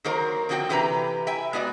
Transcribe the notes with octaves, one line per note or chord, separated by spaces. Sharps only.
D#3 F#3 A#3 A#4 C5
D3 F3 C4 F#4 G5
C3 E3 G4 B4 C5 A#5
E5 G5 G#5
G#3 B3 F#4 D5